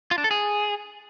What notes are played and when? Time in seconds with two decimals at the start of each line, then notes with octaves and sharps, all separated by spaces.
0.11 F4
0.18 D4
0.24 A4
0.31 G#4